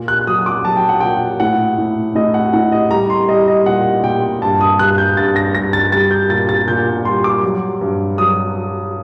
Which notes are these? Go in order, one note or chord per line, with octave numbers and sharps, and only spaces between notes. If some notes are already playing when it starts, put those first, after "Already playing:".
Already playing: A#2
F#6
F#3 D#6
D6
F#3 A5
G5
F#5
A#2 G5
A2 F#5
A2
A2 D#5
F#5
A2 F#5
D#5
G3 A#5
C6
G3 D#5
D#5
A#2 F#5
A#2 G5
G2 A5
D#6
G2 F#6
G6
G2 A6
A#6
G2 A#6
A6
G3 A6
G6
A#2 A6
A6
A#2 G6
G3 C6
D6
F#3
G2
F#3 D#6